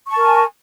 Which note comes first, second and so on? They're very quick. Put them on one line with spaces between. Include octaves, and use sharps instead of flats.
C#6 A5 A#4 G#5